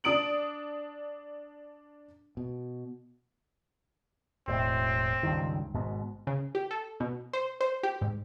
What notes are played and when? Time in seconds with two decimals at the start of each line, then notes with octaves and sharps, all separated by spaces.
0.04 D4 D#6 D7 F#7
2.37 B2
4.48 E1 A2 C4
5.23 C#2 G2 D#3
5.74 G#1 G#2 B2
6.27 C#3
6.55 G4
6.71 A4
7.00 B2
7.33 C5
7.61 C5
7.83 G4
8.01 G#2